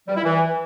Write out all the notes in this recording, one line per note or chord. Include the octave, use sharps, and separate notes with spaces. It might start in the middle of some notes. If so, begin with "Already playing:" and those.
G3
E4
E3